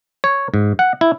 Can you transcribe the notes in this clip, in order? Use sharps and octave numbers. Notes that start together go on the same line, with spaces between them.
C#5
G#2
F#5
E4